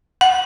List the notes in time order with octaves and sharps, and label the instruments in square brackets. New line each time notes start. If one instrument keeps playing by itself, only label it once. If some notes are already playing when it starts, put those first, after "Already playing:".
[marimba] F#5